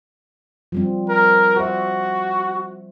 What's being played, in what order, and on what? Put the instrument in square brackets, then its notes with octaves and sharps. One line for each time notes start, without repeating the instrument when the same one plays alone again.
[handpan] F3 G3 C4
[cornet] A#4
[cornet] F#4 [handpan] C5 E5